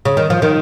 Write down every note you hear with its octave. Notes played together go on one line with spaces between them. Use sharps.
C#3
D#3
F3
D#3